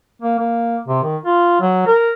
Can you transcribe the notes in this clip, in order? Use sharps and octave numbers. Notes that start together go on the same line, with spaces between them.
A#3
A#3
C3
D#3
F4
F#3
A#4